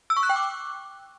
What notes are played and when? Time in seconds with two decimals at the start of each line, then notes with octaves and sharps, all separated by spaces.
0.10 E6
0.17 C#6
0.23 F#6
0.29 G5
0.36 D6